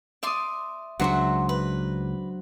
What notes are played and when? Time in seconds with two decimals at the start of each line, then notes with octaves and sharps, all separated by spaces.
0.23 D5 E5 C6 D6 D#6
1.00 C#2 C#3 F#3 D4 F#4 C5 E5 F#5
1.49 B4